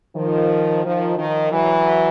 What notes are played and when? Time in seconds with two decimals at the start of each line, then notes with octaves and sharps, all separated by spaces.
0.16 D#3 F3
0.84 D#3 F3
1.18 D#3 F3
1.52 E3 F#3